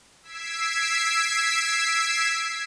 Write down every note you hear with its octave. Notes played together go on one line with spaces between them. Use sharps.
E6 G#6 B6 C7 D7 E7